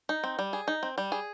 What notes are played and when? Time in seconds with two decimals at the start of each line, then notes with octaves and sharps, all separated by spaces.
0.09 D#4
0.24 C4
0.39 G3
0.53 G#4
0.68 D#4
0.83 C4
0.98 G3
1.12 G#4